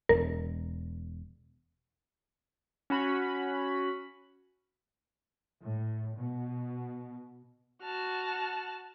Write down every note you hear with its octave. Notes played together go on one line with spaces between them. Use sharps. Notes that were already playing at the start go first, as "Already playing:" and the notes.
E1 A#4
C#4 F#4 B5
A2
B2
F#4 A5 F6